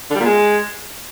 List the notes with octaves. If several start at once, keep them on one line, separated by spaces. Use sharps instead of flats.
D3
G3
A#2
G#3